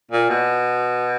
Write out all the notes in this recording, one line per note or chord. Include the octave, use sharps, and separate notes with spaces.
A#2
B2